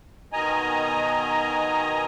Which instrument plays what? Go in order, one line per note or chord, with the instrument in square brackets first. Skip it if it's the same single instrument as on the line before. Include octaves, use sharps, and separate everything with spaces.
[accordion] B2 D#3 D#5 G#5 A#5